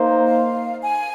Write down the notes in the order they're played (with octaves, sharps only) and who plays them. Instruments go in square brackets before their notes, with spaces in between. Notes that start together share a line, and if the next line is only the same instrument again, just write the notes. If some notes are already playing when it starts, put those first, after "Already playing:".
Already playing: [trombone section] A#3 D#4 C5
[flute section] F5
G#5